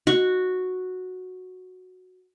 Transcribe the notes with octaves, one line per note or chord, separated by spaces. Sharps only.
F#4